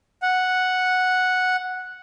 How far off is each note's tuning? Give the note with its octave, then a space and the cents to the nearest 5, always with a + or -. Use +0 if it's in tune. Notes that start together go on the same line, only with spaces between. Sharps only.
F#5 -5